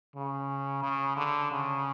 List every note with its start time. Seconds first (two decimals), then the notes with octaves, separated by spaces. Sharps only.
0.15 C#3
0.83 C#3
1.17 D3
1.51 C#3